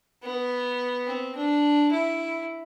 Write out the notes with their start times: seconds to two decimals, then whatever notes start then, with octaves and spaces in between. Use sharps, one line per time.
0.23 B3
1.06 C4
1.35 D4
1.91 E4